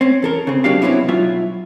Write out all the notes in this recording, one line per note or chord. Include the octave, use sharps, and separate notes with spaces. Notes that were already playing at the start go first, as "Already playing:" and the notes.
C4 C#4
E2 A4 A#4
C#3 C4
C2 F#3 D4 F#4 G4 F5
B2 F#3 C4 C#4 E4
B1 F#3 F4 E5